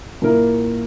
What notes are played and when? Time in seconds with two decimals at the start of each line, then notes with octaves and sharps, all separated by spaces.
0.22 A#2 A#3 E4 A#4